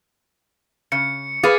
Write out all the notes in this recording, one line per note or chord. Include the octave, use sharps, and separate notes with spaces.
C#3 C#7
G#4 B4 F5 D6 A6 D#7